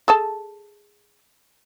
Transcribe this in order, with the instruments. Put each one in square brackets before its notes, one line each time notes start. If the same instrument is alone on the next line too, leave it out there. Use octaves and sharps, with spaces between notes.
[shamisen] G#4 A4 A5